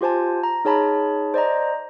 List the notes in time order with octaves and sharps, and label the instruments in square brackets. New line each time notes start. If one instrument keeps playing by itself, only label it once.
[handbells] F4 G4 C5 G#5 A5
A#5
D#4 G#4 C#5 A5 B5
C5 D5 D#5 A#5